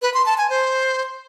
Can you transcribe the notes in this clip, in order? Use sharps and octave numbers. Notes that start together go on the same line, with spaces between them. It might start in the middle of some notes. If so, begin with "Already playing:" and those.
B4
C6
A5
G#5
C5